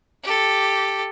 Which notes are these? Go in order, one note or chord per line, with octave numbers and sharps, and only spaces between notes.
G4 A4